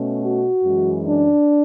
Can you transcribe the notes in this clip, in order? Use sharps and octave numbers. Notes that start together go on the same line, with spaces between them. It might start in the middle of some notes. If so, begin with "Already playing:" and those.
Already playing: B2 A3 C#4
F#4
F#2 E3 G#3
D4